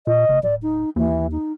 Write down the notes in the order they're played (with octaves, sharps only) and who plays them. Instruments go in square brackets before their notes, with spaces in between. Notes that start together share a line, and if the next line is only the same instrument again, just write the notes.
[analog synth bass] A#2 [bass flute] D#5
[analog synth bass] F#1
[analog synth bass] D1 [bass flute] D5
[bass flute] D#4
[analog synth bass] D#2 [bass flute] E3
[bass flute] D#4